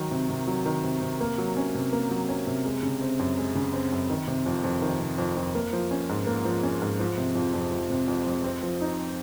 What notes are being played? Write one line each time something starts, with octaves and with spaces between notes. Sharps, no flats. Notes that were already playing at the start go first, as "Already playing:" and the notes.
Already playing: D#3 F#3
C3
C3
F#3
D#3
C3
C3
A#3
F#3
C#4
C3
A#3
F#3
C#4
C3
G#3
C#3
C4
F#2
G#3
C#3
C4
F#2
D#3
C3
F2
F2
D#3
C3
F2
F2
A#3
F3
C#4
G#2
A#3
F3
C#4
G#2
F3
C3
F2
F2
F3
C3
F2
F2
C4
F3
D#4